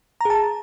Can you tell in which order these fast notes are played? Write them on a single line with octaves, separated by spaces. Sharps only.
A#5 G#4 A5